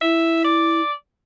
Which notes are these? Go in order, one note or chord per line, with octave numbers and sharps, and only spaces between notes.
E4 E5
D5